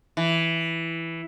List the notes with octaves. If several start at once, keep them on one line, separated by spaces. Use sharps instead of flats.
E3